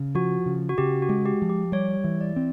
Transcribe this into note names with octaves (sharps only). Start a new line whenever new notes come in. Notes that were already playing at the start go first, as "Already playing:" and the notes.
Already playing: C#3
F3 F#4
C#3
F#4
C#3 G4
F#4
G#3
G4
F3
G4
G3 C#5
E3
D5
C4